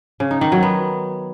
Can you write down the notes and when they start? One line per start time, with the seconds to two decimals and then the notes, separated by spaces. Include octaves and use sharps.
0.20 C#3
0.31 D#4
0.41 D#3
0.52 F#3
0.63 B3